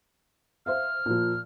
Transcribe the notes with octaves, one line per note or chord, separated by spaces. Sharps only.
C5 E5 F5 F6
A#2 F3